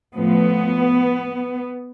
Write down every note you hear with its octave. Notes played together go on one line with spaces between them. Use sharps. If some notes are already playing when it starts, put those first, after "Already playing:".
A2 F3 A3 B3